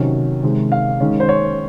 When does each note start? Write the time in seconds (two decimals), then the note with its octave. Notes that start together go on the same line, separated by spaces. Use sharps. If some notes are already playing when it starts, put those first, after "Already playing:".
Already playing: C3 D#3 F#3 C#4
0.43 C3 D#3 G#3
0.72 F5
1.00 D#3 G#3 C#4
1.20 C5
1.29 C#5